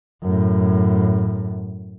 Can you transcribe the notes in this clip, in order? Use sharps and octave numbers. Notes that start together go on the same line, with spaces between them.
F#2 A2